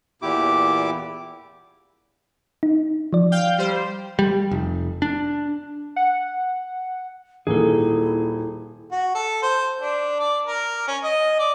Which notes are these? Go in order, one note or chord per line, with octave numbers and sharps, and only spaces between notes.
E2 A#2 E4 G4 D6
D#4
F3 D5
F5 G5 G6
G3 C5
G3
F1
D4
F#5
D#1 D#3 E4 G#4 A4
F#4
A4
C5
D4
D5
A#4
C#4
D#5
D5